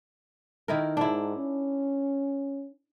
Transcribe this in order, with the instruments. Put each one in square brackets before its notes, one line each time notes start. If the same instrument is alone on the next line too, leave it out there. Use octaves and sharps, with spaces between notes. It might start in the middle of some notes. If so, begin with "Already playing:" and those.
[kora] D#3 E4 A#4
[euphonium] G#2 [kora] D4 E4
[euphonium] C#4